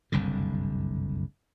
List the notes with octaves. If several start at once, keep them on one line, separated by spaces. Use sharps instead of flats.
F#1 C2 G2 D3